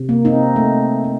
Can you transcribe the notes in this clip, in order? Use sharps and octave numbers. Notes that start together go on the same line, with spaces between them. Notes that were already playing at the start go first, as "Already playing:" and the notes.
Already playing: C3
A#3
C4 D#4
A3
A3